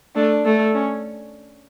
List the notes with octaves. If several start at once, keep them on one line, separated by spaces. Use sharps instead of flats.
A3 D4
A3
C#4